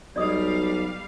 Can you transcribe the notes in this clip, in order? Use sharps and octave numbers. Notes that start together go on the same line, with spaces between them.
B1 G3 D5 D#5 F5 D#6